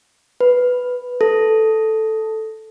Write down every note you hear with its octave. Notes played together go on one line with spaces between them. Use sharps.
B4
A4